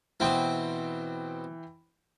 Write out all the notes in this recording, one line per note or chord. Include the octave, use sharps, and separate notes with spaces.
B2 E3 C4 G5